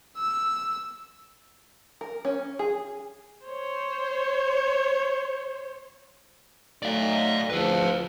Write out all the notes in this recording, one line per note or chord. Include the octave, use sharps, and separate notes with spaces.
E6
A#4
C#4
G#4
C5 C#5
F#3 A3 D#4 D5 F5
D2 F3 G#4 B4